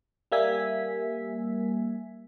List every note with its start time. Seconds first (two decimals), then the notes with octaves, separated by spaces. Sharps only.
0.32 G3 A#3 E5 G#5 B6